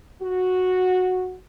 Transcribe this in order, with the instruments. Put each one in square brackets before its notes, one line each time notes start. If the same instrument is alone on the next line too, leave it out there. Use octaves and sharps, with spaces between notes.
[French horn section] F#4